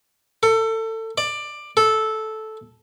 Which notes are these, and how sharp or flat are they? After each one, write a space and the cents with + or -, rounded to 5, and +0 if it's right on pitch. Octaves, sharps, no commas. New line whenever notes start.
A4 +25
D5 +15
A4 -10